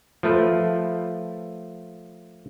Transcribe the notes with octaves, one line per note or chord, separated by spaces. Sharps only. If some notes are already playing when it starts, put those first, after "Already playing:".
F3 A3 B4